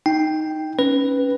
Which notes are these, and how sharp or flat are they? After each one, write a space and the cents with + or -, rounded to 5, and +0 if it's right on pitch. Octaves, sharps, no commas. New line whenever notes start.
D#4 +0 G5 +0
C#4 +0 B4 +0